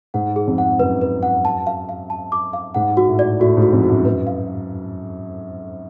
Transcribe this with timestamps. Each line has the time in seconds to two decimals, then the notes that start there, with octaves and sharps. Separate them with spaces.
0.14 G#2 F#5
0.36 G#4
0.47 F2
0.58 F#5
0.79 F#2 B4
1.01 B4
1.23 F#5
1.45 A5
1.67 F5
1.89 F5
2.10 A5
2.32 D6
2.53 F5
2.74 G#2 F#5
2.97 F#4
3.08 A2
3.19 D5
3.40 A2 F#4
3.57 G#2
3.62 F#4
3.73 F2
3.84 F#4
3.89 F#2
4.05 F#2 B4
4.27 F5